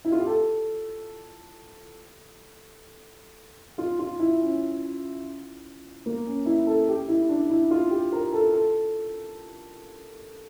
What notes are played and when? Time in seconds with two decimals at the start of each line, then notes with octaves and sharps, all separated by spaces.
0.05 E4
0.12 F4
0.20 G4
0.26 A4
3.78 F4
3.99 F4
4.20 E4
4.40 C#4
6.06 A#3
6.26 C#4
6.46 E4
6.67 A4
6.88 G4
7.08 E4
7.29 D4
7.50 E4
7.71 F4
7.91 G4
8.12 A#4
8.33 A4
8.53 A4